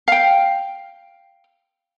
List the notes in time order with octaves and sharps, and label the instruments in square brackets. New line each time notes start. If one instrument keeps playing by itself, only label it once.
[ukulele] F5 G5